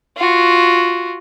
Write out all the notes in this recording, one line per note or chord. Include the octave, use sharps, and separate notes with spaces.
F4 F#4